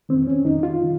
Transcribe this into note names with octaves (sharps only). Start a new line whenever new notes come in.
F2 D#3 C4
C#4
F2 D#3 D#4
F4
D#3